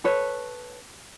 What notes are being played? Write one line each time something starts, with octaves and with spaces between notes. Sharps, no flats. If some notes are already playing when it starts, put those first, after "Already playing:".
A4 B4 C#5